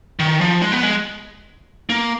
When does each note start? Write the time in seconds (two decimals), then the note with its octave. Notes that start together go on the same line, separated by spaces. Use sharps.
0.19 D#3
0.41 F3
0.62 G#3
0.72 B3
0.83 G#3
1.90 A#3